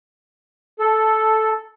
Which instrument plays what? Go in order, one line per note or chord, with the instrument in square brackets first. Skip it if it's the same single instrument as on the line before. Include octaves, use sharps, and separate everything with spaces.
[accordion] A4